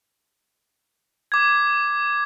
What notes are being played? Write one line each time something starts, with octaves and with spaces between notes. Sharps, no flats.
D6 G#6